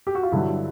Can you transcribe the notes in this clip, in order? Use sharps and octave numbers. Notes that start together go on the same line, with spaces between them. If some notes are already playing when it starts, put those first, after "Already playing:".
G4
F#4
F4
G2 D3 F#3 E4